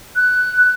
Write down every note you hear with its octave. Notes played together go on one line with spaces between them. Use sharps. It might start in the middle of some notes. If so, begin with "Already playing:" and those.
F#6